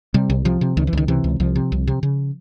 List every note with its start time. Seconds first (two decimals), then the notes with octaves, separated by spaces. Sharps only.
0.14 C3 G3
0.30 C2
0.45 C3 F3
0.61 C3
0.77 C#2 D#3
0.87 E3
0.93 C#2 D#3
1.08 C3 E3
1.24 C#2
1.40 C2 F3
1.56 C3
1.72 C2
1.87 C3
2.03 C#3